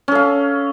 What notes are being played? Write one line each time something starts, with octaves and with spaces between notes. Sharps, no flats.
C#4 A4 F5